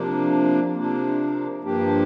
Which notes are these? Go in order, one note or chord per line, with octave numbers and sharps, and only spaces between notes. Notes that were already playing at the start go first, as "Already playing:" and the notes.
Already playing: C3 F3 A#3 D4
C3 F3 A#3 D4
G2 F3 A#3 D4 G4